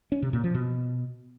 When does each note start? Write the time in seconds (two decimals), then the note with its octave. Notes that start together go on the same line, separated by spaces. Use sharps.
0.12 C#4
0.22 C3
0.33 A#2
0.44 F3
0.54 B2